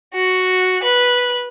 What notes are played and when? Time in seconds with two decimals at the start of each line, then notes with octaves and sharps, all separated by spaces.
0.14 F#4
0.83 B4